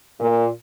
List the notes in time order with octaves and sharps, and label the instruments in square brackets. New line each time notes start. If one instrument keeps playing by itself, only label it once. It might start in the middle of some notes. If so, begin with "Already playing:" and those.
[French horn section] A#2